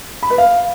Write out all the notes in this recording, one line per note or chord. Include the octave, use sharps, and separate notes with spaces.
B5
B4
F5